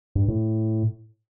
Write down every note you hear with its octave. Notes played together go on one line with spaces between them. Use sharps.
G2
A2